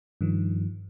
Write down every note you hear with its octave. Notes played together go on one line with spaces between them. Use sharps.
G2 D#3 F3